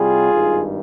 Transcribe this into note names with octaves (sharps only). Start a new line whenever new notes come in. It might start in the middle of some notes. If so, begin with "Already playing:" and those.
Already playing: C2 C3 G3 F4 G#4
G#1 G2 D#3